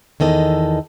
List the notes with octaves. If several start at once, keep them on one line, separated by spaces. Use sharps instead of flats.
E2 D#3 A4 D#5